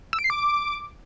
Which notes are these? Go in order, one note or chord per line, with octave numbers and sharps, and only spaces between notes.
E6
D7
C7
D6